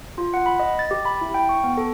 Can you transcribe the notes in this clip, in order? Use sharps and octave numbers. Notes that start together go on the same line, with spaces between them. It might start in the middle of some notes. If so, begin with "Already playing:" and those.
F4
F#5
B5
D#5
A6
G4
B5
E4
G5
C#6
B3
A4